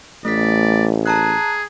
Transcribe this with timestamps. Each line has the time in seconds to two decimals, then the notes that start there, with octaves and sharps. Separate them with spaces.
0.25 A1 A3 D5 B6
1.06 G#4 A5 A#5 F#6